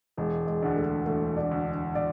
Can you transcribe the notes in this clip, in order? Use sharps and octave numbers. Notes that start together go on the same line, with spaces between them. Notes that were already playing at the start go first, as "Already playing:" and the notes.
E1 G#3
G#3
D2 D3
A3
E1 A3
D4
D2 D3
D5